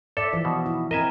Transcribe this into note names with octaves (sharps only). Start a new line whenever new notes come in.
A4 D5 E5
E3 F3
B2
E4
C4 A#4 D#5 E5 G#5